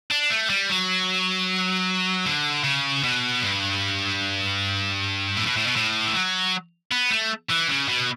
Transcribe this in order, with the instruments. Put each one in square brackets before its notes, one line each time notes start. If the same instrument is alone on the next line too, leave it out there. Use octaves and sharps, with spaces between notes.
[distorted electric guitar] D4
A3
G3
F#3
D3
C#3
B2
G2
A2
B2
A2
B2
A2
E3
F#3
B3
A3
E3
C#3
B2